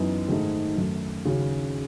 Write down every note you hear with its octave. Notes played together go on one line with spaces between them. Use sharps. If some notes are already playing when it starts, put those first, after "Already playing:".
Already playing: F#2 E3 B3 D#4
G#2 D#3 A3 D#4
F#2 D#3 A3
D#2 C#3 F#3 C#4 F#4